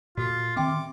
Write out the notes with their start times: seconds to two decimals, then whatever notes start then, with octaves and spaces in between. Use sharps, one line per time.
0.17 A#2 F4 F#4 A4
0.56 D#3 C4 E5 G5 C6 D6